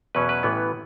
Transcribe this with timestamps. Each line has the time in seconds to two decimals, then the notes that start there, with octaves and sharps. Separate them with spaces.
0.15 E2 B2 F#3 C#4 B4
0.29 B4
0.43 A1 A2 E3 B3